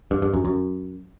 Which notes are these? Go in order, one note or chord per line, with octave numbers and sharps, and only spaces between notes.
G2
G2
F#2
F#2